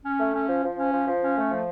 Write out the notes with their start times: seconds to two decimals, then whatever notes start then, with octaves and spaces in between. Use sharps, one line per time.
0.04 C#4
0.18 A3
0.33 C#4
0.48 F3
0.63 F3
0.77 C#4
0.92 F3
1.06 F3
1.22 C#4
1.36 A3
1.50 F3